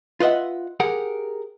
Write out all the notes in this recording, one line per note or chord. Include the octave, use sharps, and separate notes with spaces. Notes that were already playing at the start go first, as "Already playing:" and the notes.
F4 B4 D#5 E5 F#5
G4 G#4 A#4 F#5